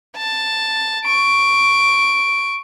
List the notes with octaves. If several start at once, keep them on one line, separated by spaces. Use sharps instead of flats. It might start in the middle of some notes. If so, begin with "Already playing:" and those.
A5
C#6 D7